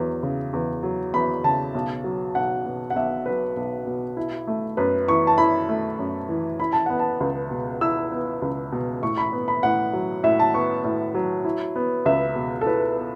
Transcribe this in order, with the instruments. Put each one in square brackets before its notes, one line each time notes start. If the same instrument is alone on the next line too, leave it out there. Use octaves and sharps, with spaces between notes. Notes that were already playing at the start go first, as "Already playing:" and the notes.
Already playing: [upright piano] E2 F#3
C#3
E2
F#3
E2 B5
C#3 A5
B1
F#3
B1 F#5
B2
F#5
B1 E5
F#3 B4
B1
B2
E4
A3
F#2 B4
E3 C#6
A5
E4 B5
A3
F#2
E3
E4 B5
A5
B3 F#5
A5
C#2
B2
E4 E6
B3
C#2
B2
A2 C#6
B5
B3
B5
A2 F#5
F#3
A2 E5
A5
B3 C#6
A2
F#3
E4
B3
C#2 E5
B2
A4
E4 B4
B3